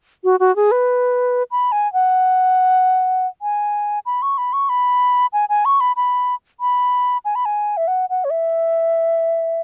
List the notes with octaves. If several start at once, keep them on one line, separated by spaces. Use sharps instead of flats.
F#4
F#4
G#4
B4
B5
G#5
F#5
G#5
B5
C#6
B5
C#6
B5
G#5
G#5
C#6
B5
B5
B5
G#5
B5
G#5
E5
F#5
F#5
C#5
E5